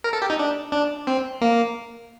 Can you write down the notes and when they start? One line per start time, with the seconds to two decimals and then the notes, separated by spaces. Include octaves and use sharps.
0.04 A#4
0.13 A4
0.22 G4
0.30 D#4
0.39 D4
0.72 D4
1.07 C4
1.41 A#3